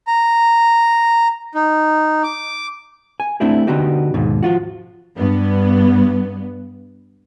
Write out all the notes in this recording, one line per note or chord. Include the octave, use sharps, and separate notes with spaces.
A#5
D#4
D6
G#5
A3 C4 D4 E4 G4
D3 B3 D#4 F#4 G4
D#2 G#2 B2
F3 F4 F#4
G2 B3